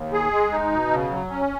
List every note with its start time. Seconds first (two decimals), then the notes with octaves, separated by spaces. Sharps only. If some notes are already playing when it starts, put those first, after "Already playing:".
Already playing: D#2
0.13 G#4
0.32 G#3
0.52 D#4
0.72 B2
0.92 C#3
1.11 F#3
1.30 C#4